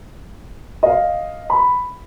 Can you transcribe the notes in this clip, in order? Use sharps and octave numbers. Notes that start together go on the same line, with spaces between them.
D#5 F5
B5